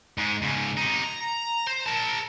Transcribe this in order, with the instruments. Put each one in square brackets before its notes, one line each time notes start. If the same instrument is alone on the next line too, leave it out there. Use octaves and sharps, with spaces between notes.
[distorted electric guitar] G#2 G#3
G#2 C#3
C3 D#4
A#5
C5
A#4 A5